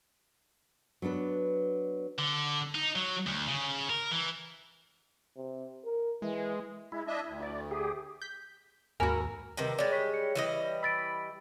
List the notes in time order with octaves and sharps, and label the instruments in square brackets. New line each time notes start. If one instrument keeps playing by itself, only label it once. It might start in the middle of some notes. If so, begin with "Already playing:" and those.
[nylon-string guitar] F#3 B3 D4 B4
[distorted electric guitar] D3
D#4
F#3
D2
C#3
A#4
E3
[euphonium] C3
A#4
[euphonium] E3 [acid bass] G#3
[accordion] G#3 [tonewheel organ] E4
[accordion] D4 D#5 E5
D2
[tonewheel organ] D5
G4 G#4
[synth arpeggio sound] G6 B6
[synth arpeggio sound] D#2 B5 E6 [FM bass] G#2 [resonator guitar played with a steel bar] F#4 G#5 [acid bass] A#4
[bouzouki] C3 D#3 G3 [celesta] A#4 B4 D#5
[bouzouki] G3 G#3 [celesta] C#5 A6 [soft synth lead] D5
[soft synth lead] C#5 [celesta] B6
[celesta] C#7
[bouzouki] E3 G3 D#5
[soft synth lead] B5 [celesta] E6 A6 D7